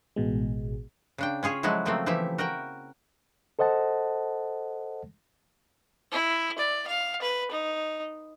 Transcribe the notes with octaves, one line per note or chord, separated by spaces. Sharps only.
A1 B2 G#3
C#3 D4 G5
C#4 F4 G#4 C#5
F3 F#3 G#3 E4 F#4 A4
C#3 F3 F#3 A3 A#3 C4
E3 F3 E4 G4 E5
F#4 A#4 F#5 G5
A4 C5 D#5 F#5 A5
E4
D5
F5
B4
D#4